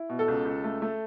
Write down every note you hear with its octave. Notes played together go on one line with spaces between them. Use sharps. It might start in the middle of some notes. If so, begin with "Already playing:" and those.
Already playing: E4
B2
A4
C#2
C#2
A3
A3